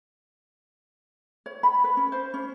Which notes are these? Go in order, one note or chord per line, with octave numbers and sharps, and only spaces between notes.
C#5
B5
B4
C#4
C5
C#4